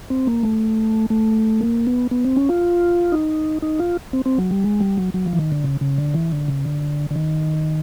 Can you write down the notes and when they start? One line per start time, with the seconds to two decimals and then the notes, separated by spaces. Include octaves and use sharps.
0.10 C4
0.27 A#3
0.43 A3
1.10 A3
1.61 A#3
1.87 B3
2.11 B3
2.24 C4
2.37 C#4
2.49 F4
3.12 D#4
3.62 D#4
3.79 F4
4.13 C4
4.26 C4
4.38 F#3
4.51 G3
4.64 G#3
4.80 G3
4.97 F#3
5.14 F#3
5.26 F3
5.33 E3
5.39 D#3
5.52 D3
5.64 C#3
5.81 C#3
5.98 D3
6.14 E3
6.32 D3
6.48 C#3
6.65 D3
7.11 D3
7.15 D#3